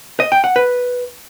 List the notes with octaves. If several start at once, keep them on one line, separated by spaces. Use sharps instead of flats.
D#5
G5
F#5
B4